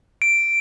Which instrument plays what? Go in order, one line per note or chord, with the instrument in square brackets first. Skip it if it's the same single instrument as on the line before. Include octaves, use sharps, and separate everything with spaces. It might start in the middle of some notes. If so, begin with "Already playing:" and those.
[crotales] D7